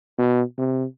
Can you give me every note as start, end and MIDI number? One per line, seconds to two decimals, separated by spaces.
0.18 0.42 47
0.58 0.85 48